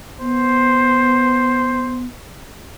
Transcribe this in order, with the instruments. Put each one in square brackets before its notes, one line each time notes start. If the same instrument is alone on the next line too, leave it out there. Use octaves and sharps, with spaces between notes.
[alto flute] B3 [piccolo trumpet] C5